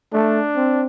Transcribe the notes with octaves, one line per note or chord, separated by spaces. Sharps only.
A3 D4
C4